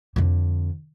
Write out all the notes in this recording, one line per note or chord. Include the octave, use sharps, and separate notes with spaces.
F2 D3